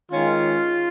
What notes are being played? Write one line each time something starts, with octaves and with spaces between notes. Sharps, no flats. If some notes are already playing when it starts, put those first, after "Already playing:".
D#3 G#3 C#4 F4